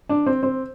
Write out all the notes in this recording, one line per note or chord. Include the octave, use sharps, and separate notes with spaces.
D4
C4
C4